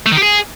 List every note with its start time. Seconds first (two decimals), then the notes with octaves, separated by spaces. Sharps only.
0.06 A3
0.12 D#3
0.17 G4
0.23 G#4